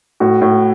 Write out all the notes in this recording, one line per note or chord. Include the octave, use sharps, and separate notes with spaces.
A2 F#4
A2